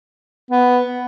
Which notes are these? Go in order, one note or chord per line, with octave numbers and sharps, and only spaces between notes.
B3